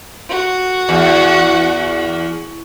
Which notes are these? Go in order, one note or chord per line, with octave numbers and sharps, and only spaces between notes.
F#4
E2